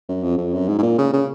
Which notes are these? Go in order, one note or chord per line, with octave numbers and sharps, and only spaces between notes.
F#2
F2
F2
F#2
G#2
G#2
A#2
C#3
C#3